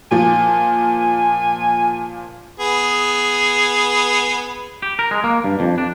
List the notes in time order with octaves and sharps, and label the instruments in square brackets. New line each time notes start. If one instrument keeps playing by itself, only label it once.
[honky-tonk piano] A#2 F3 [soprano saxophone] G#5
[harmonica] B3 G#4
[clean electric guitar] G4
A#4
G#3
A#3
G2
F2
D4